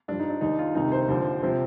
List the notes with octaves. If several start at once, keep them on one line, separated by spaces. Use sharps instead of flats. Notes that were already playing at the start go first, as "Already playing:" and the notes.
G2 F3 D4
D#4
D4
D#2 D#3 D#4
F4
C2 C3 D#3 D#4
C5
D#2 D3 F3
C3 F3 C5